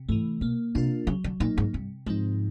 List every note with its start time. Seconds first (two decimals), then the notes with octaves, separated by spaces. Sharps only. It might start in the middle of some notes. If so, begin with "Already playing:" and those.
Already playing: C3
0.09 G#2 A3
0.12 E3
0.41 B2 A#3
0.75 C3 D4 F4 A#4
1.07 C#3 F#3
1.24 D3
1.40 A#2 A#3 D#4
1.58 G#2
1.73 G2 C3
2.06 G#2 F3 G#3 C4 D#4